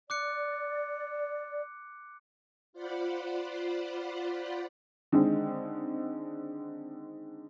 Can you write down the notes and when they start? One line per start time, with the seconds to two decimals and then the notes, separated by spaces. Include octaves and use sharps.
0.10 D5 D6 F#6 C#7
2.73 F4 C5 D5 F#5 B5
5.12 D3 D#3 G#3 C4